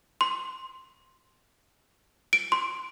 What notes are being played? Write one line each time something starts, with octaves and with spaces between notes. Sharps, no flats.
C6
D7
C6